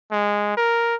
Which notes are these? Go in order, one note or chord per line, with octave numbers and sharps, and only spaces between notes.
G#3
A#4